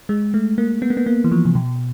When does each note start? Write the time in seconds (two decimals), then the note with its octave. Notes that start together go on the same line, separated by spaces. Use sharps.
0.09 G#3
0.34 A3
0.58 A#3
0.82 B3
0.90 A#3
0.97 B3
1.06 A#3
1.24 E3
1.31 F3
1.45 C3
1.55 B2